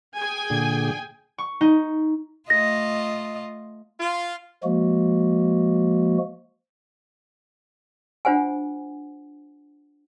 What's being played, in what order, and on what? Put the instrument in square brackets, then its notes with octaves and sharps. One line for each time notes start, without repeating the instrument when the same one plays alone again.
[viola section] G#4 G5 G#5
[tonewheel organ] A#2 D3
[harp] C#6
D#4
[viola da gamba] A3 F4 D#5 [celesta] A#6
[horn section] F4
[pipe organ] F3 G#3 A#3 F#4
[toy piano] D4 F4 C5 F#5 G#5